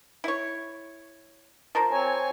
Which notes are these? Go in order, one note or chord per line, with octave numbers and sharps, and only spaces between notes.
E4 C#5
F3 A#4 C5
C4 C#5 G#5